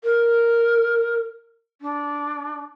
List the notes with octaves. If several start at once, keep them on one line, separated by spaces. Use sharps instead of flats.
A#4
D4